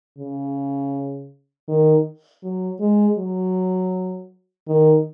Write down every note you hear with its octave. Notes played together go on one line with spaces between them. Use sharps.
C#3
D#3
F#3
G#3
F#3
D#3